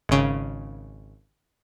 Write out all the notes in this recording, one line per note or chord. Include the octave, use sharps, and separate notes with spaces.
G#1 C#3